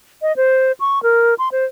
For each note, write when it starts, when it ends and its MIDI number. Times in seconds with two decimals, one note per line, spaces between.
0.22 0.35 75
0.36 0.72 72
0.80 1.02 85
1.03 1.34 70
1.38 1.49 84
1.52 1.65 72